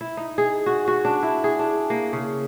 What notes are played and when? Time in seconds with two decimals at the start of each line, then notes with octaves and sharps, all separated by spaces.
0.01 E4
0.17 D#4
0.38 G#4
0.66 F#4
0.88 F#4
1.05 D4
1.23 E4
1.44 G#4
1.59 D4
1.90 A#3
2.13 C#3